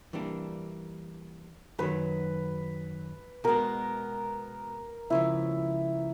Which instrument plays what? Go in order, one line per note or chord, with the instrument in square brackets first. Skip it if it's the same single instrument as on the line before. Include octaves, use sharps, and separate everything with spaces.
[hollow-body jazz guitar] E3 G3 A#3 D4
[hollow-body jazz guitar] F#2 D#3 F#3 [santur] B4
[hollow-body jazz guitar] B2 G#3 B3 [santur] A#4
[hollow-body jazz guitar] C#2 C#3 F3 [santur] E4